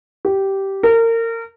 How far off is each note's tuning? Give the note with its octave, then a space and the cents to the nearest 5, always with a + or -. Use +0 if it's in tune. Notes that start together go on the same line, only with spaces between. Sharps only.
G4 -10
A#4 -30